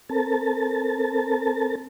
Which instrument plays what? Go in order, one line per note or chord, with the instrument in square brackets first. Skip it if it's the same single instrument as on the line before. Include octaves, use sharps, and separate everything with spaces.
[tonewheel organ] C4 A4 A#4 A5